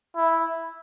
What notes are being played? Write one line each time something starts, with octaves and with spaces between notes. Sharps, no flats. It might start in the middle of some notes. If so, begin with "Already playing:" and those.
E4